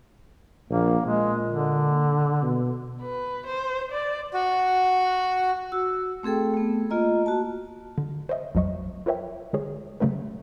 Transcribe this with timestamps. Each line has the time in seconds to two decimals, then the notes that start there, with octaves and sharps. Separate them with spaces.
0.70 A#1 A#3
1.06 A#2 G#3
1.48 D3
2.42 B2
3.02 B4
3.47 C5
3.92 D5
4.34 F#4
5.72 F#4 E6
6.23 A3 C4 G#4 A4 G5
6.54 A3 B3
6.90 A#3 F4 D#5 A#5
7.26 F#4 A5
7.98 D3
8.29 C5 C#5 D#5 E5
8.55 A#1 F2 F#3 D#5 C#6
9.06 F4 A#4 B4 C#5 E5 G5
9.53 D3 G#3 G#4 C#5
10.00 C#3 F#3 A3 C#4 B4